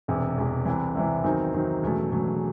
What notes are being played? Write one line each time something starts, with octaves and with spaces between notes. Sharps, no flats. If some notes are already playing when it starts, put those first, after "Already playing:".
E1 E2 C3
E1 E2 C3
C2 C3 E3
C2 C3 E3
E2 D#3 F#3 C4 D#4
E2 D#3 F#3 C4 D#4
E1 E2 C#3 F#3 A3
E1 E2 C#3 F#3 A3